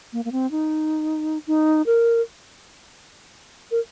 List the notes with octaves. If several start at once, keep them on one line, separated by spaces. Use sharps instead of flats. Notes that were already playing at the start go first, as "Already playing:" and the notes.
A#3
A#3
C4
D#4
D#4
A#4
A#4